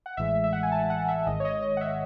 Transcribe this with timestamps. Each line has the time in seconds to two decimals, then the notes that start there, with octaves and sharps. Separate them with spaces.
0.06 F#5
0.17 A1 A2 E3 G#3 E5
0.44 E5
0.53 F#5
0.63 G#5
0.72 A5
0.90 F#5
1.09 E5
1.26 G#1 G#2 D#3 G#3 D#5
1.40 C#5
1.45 D#5
1.62 D#5
1.77 F#5
1.81 E5